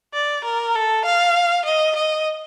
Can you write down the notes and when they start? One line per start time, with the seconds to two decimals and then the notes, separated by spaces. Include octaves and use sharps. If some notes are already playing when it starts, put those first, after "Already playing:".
0.14 D5
0.45 A#4
0.75 A4
1.05 F5
1.65 D#5
1.96 D#5